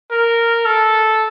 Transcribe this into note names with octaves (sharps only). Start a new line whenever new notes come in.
A#4
A4